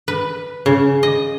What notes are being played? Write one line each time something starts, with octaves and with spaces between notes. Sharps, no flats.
B4
C#3
D#5